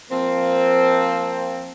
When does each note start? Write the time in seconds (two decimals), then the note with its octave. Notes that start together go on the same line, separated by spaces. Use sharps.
0.12 F3 A#3 C4